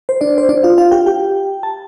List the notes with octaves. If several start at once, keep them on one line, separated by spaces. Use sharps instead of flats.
C5
D4 D5
C5
D4 D5
F4 F5
F4 F5
G4 G5
G4 G5
A5